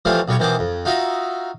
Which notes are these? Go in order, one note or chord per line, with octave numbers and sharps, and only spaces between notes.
E3 F3 G3 A3 F4 C5
B1 B2 G3 C#5 C#6
B2 D#3 E3 C5 G5 D6
F2
D#4 F4 F#4 D#5 E5